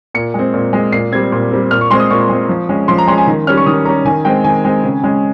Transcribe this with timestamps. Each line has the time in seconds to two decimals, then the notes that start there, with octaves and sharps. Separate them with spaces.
0.14 A#2 C#7
0.34 G#3 C4
0.54 A#2
0.73 G#3 C4
0.92 A#2 C7
1.12 G3 C4 G#6
1.32 A#2
1.51 G3 C4
1.71 A#2 F6
1.81 C#6
1.91 G#3 C4 C6
2.00 D#6
2.10 A#2 C#6
2.29 G#3 C4
2.49 F3
2.69 G#3 C#4
2.88 F3 C6
2.98 A#5
3.07 G#3 C#4 C6
3.18 G#5
3.27 D#3
3.47 G3 C#4 F6
3.57 C#6
3.66 D#3 D#6
3.85 G3 C#4 A#5
4.05 D#3 G#5
4.25 G#3 C4 G5
4.44 D#3 G#5
4.65 G#3 C4
4.84 C#3
5.03 G#3 C#4